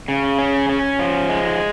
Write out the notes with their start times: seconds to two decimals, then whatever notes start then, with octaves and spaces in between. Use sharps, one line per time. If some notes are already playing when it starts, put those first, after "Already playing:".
0.08 C#3
0.39 C#4
0.69 C#4
0.99 F3
1.29 G#3